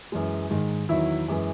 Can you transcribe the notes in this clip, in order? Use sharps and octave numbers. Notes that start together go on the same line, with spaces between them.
F#2 E3 G#3
G#2 D#3 G#3
E2 D#3 F#3 E4
F#2 E3 G#3